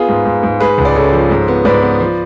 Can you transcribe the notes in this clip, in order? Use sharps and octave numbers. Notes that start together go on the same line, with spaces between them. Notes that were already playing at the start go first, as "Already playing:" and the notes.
Already playing: B3 F4 G#4
G#2
G#2
G#2
G#3 G#4 B4
C#2
D5
C#3 A4 C#5
F3
G#2
B3
G#2 B4 D5
B3
F3